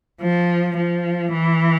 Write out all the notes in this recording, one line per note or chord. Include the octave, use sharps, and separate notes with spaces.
F3
F3
E3